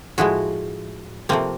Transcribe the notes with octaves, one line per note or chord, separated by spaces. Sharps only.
A2 F3 G#3 E4 F#4
C3 F3 A3 A#3 C4